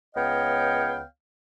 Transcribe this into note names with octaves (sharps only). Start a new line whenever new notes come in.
C#2 B3 C#5 D#5 F5 G5